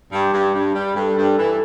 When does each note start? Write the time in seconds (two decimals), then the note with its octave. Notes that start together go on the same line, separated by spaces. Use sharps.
0.12 G2 G4
0.33 G2
0.54 G2
0.75 G3
0.95 G2 A4
1.17 G2
1.38 E3